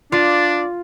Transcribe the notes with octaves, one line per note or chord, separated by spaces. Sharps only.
D4 F4 D5